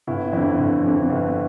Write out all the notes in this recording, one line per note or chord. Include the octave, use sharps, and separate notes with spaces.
G1 E4
F2 D3 E4
G1
F2 D3
G1